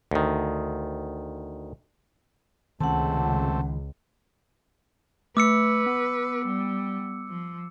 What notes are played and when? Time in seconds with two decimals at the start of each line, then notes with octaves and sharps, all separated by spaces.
0.11 D2 D#3
2.80 C#2 C3 D#3 A3 C#4 F#5 A5
5.37 A3 B4 D6 E6 C#7
5.86 B3
6.46 G3
7.29 F3